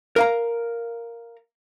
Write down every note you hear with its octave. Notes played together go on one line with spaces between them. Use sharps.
A#4 F5 A#5